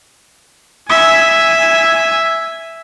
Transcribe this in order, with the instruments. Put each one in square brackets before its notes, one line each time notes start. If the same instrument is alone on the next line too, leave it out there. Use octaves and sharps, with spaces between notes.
[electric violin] E5 G#5